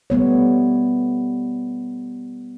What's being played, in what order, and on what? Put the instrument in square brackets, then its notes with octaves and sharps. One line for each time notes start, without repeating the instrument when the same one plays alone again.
[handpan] G3 A3 B3 C#5